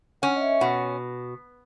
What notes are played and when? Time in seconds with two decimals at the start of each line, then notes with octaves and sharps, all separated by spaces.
0.22 C#4 F#5
0.37 D#5
0.41 E5
0.61 B2 F#5